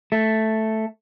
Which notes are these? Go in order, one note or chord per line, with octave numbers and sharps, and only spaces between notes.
A3